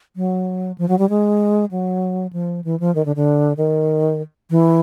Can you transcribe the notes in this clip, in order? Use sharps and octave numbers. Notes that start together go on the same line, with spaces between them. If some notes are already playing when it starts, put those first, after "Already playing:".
F#3
F3
F#3
G3
G#3
F#3
F3
E3
F3
D#3
D3
D3
D#3
E3